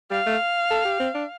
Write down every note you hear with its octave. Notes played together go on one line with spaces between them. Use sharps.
G3 F5
A3
A4
G4
C4
D4